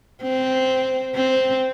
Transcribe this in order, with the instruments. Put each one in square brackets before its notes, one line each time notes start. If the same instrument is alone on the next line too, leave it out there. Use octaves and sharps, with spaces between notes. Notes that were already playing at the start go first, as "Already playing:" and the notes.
[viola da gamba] C4
C4